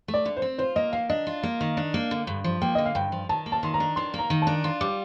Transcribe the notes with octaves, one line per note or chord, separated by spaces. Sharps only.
A3
D5
D3
C5
C4
F4 C5
A#3 D#5
D#3 F5
D4 D#5
F4
A#3
D#3
D4
A#3
D3
G2
F3
A#3 G5
D3 D#5
F5
G2 G5
F3
D#3 A5
A#3
A5
D#3 C6
A#5
D4
D#3 C6
A#3
A#5
D#3
D4 A5
F4 C6
G3 D6